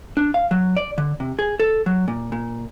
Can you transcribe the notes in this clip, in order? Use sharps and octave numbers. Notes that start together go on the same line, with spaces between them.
D4
F5
F#3
D5
D3
C3
G#4
A4
F#3
A#2
A#2